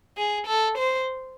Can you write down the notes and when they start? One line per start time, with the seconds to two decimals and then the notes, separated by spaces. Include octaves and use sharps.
0.17 G#4
0.47 A4
0.78 C5